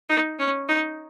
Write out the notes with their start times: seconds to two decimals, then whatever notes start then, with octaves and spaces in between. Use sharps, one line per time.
0.09 D#4
0.39 C#4
0.68 D#4